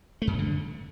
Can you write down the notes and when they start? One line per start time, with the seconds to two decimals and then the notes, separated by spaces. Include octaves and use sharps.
0.22 A3
0.27 F#2
0.33 E3
0.39 D3